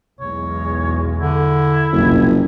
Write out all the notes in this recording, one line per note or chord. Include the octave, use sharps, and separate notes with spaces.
B1 E2 G#3 C#5
D3 E4
F#1 C2 F2 B2